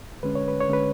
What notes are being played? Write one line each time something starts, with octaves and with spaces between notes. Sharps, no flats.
D3 G#3 C#4 B4
C#5
B4
C#5
D3 G#3 C#4 B4